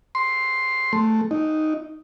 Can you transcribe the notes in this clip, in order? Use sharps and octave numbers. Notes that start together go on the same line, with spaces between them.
C6
A3
D#4